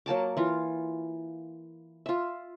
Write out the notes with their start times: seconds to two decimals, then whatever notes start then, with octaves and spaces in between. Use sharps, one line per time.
0.06 F#3 A#3 A5 D6
0.37 E3 F4
2.06 F4 E5